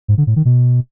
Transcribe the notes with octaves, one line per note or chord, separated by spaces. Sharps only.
G#2
D3
A2
D#3
B2